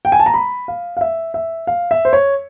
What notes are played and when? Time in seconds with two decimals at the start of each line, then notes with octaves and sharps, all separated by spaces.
0.05 G5
0.12 G#5
0.20 A5
0.26 A#5
0.34 B5
0.68 F5
0.97 F5
1.01 E5
1.34 E5
1.67 F5
1.91 E5
2.05 C5
2.13 C#5